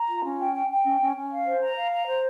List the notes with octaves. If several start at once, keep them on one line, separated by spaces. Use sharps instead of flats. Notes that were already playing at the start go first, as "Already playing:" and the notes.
Already playing: A#5
F4
C#4
G5
G5
G5
C#4
C#4
C#4
F5
C5
A#5
F5
A#5
C5